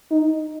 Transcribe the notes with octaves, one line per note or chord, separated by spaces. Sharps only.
D#4